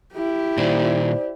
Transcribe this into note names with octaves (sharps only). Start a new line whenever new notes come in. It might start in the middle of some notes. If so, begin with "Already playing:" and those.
E4 G4
A#2 D#3 C5 D5